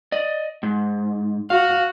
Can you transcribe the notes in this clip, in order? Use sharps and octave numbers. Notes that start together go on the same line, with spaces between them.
D5 D#5
G#2
F#4 F5